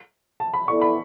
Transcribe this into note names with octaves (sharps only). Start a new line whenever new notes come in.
A5
B5
B3 E4 A4 D5 C#6
B5